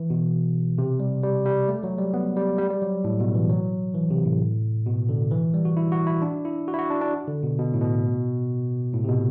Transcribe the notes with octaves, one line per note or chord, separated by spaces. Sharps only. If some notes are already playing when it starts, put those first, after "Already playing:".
Already playing: E3
B2
C3
G3
G3
G3
A3
F#3
G3
B3
G3
G3
G3
F#3
A2
B2
E3
F#3
E3
C3
A2
B2
D3
E3
G3
F#4
E4
F#4
E4
D4
E4
F#4
E4
F#4
D4
D4
D3
B2
B2
A2
B2
A2
C3
B2